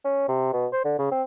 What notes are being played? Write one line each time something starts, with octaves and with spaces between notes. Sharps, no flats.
C#4
C3
B2
C5
D3
C#3
C4